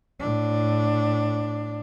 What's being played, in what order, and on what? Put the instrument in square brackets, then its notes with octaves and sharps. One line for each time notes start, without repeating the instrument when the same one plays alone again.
[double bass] A2 D4